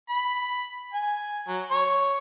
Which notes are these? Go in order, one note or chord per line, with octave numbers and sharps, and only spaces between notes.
B5
G#5
F#3
C#5